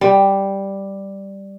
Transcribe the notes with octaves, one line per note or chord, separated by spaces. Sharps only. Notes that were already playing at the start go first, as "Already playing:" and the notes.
G3